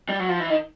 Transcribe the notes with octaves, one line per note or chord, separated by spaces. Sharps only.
G3
F#3
F3
E3
D#3